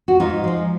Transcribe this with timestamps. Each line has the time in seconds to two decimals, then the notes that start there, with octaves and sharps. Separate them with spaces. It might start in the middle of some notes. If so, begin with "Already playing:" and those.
0.08 F#4
0.20 G#2 D#4 F4
0.44 F3 G#3